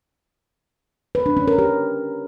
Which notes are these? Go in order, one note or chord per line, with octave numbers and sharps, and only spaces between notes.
B4
D4
C#4
A#4
G4